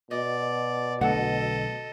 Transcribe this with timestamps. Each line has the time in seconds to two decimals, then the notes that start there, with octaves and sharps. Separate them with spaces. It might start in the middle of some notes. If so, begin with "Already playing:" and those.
0.11 B2 D5 D#5
1.01 B1 D3 A3 A4 D#5 F#5